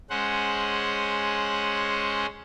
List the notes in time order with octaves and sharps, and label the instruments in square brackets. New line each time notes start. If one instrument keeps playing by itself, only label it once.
[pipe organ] G#3 C#4 C5 F#5